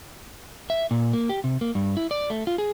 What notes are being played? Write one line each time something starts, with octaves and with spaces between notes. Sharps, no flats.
E5
A#2
A#3
G4
C3
A#3
G2
E4
D5
A3
F4
G#4